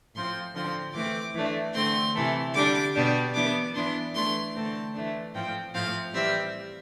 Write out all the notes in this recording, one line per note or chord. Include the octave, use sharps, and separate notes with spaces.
A2 F3 C4 C6
D3 F3 C4 C6
E3 A3 C4 D6
E3 A3 D4
D3 A3 C4 C6
C3 E3 A3
D3 G3 D4 D6
B2 G3 D4
E3 B3 D4 D6
E3 B3 D4 C6
E3 A3 D4 C6
D3 A3 C4 A5
E3 A3 D4
A2 F3 C4 G5
A2 F3 C4 F5
E3 G3 C4 E5